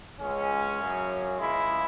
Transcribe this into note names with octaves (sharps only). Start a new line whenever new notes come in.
C#2 C#3 G#3 C#4
F#2 C#3 F#3
C#2 C#3 G#3 E4